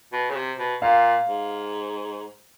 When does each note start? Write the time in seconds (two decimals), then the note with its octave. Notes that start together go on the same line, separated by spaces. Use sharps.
0.13 B2
0.30 C#3
0.36 C3
0.59 B2
0.82 A#2 F5
1.27 G#2